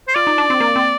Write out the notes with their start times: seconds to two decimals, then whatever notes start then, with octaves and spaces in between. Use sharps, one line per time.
0.08 C5
0.15 F4 D5
0.27 D#4
0.38 D4
0.50 C4
0.60 A#3
0.76 C4